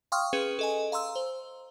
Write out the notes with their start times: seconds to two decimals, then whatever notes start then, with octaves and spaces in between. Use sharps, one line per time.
0.12 F5 G5 C6 C#6 D#6 F6
0.33 C#4 G#4 B4
0.59 A4 D#5 G#5
0.92 F5 A#5 C6 E6
1.15 C5